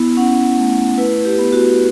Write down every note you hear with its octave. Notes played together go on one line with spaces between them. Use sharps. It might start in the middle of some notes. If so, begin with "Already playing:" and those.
Already playing: B3 E4
C#4 F#5
A3
E4 B4
G4
B3
F#4